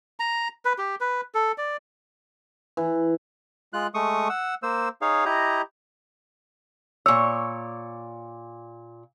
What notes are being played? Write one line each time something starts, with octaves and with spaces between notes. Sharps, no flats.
A#5
B4
G4
B4
A4
D5
E3
G#3 F4 F#6
G#3 A3 C#6 D#6
F#5 E6
A#3 C5 E6
D#4 G#4 C#5 F5
E4 G4 D#5 A#5
A#2 C#5 E6